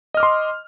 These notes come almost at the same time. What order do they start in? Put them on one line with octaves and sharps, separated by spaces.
D#5 F6 D6 C6